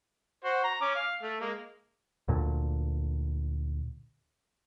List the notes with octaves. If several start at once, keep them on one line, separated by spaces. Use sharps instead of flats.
F#4 C5
A#5
C#4 D6
F5
A3
G#3 A#3
D2 A#2 D3